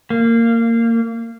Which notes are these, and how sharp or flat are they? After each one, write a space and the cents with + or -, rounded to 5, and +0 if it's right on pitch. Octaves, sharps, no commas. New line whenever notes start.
A#3 -20